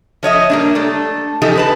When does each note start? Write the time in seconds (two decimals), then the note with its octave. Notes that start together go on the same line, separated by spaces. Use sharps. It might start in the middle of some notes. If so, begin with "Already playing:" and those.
0.23 F3 C#5 D#5 E5
0.50 G3 A#3 D4
0.75 A3 A4
1.42 E3 F3 D#4 G4 A4
1.56 D3 B4 A5